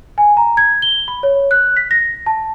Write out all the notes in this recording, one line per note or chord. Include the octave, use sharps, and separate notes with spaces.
G#5
A#5
G#6
G7
B5
C#5
F#6
B6
A#6
A5